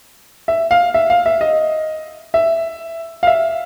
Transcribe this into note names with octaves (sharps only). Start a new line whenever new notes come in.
E5
F5
E5
F5
E5
D#5
E5
F5
E5